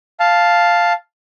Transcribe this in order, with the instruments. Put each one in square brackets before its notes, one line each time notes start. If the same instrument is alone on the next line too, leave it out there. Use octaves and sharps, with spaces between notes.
[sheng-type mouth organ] F5 A5